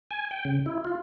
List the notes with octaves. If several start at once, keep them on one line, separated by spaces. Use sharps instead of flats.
G#5
G5
C#3
E4
F4